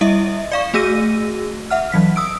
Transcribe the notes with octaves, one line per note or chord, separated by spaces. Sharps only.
G3 E4 D#5 E5
D5 F5 C#6
A3 F#4 G#4 E6 A#6 D#7
E5 F#5 F6
E3 F#3 B6
D#6 E6 D7